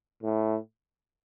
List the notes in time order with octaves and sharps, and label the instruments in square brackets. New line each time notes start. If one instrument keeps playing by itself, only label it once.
[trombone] A2